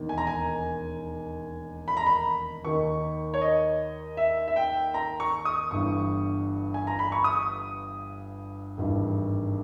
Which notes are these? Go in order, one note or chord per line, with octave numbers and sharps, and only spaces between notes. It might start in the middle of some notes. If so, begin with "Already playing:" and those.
Already playing: E1 D#2 D#3
G#5
A#5
G#5
B5
A#5
B5
D#2 D#3 C#6
C#5
D#5
E5
E5
G5
A#5
C#6
D#6
G1 G2 E3 C#6
G#5
A#5
B5
C#6
D#6
G#1 G2 E3